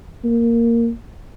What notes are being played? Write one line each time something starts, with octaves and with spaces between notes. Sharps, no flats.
A#3